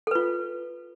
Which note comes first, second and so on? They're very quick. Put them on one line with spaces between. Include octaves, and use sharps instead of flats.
A4 B4 F4